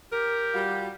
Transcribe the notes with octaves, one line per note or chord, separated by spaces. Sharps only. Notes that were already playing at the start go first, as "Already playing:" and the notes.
G4 A#4
G3 F4 F#4